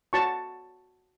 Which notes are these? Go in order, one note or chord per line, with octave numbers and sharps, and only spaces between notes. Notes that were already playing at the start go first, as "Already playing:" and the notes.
F#4 C#5 A5 C#6